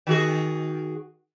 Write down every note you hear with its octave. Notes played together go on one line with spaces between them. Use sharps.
D#3 F#4 G#4